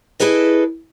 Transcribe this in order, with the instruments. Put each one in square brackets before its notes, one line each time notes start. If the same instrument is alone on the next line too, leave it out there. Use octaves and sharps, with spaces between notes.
[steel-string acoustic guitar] E4 G#4 A4 B4 D#5